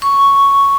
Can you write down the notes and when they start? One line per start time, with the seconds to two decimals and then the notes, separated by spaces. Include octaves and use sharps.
0.02 C#6